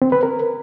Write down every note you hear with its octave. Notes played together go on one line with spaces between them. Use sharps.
C4
B4
A#4